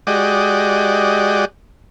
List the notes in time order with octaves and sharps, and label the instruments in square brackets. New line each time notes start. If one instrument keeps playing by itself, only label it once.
[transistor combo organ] G#3 F#4 G4 D5 D#5